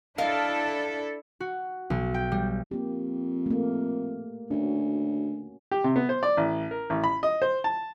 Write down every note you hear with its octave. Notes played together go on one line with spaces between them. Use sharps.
D4 E4 A4 A#4 D#5 F5
F#4
B1
G5
G3
F2 A#3 G4
A3 A#3
D2 C#4 F#4
G4
C3
B3
C5
D5
A1
A#4
A1
B5
D#5
C5
A5